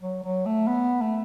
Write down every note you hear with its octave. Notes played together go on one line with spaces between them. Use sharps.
F#3
F#3
A3
B3
A3